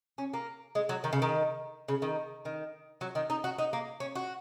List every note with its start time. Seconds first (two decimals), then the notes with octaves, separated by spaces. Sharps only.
0.18 C#4
0.33 A#3
0.75 G#3
0.89 F#3
1.04 D#3
1.13 C#3
1.22 D#3
1.88 C#3
2.02 D#3
2.45 D#3
3.01 F#3
3.15 D#3
3.30 D#4
3.44 F#4
3.58 D#4
3.73 A#3
4.00 C#4
4.15 F#4